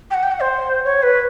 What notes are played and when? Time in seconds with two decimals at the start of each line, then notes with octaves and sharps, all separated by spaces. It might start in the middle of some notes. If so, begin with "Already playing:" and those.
0.11 G5
0.14 F#5
0.23 G5
0.32 F#5
0.40 C5
0.85 C#5
1.02 B4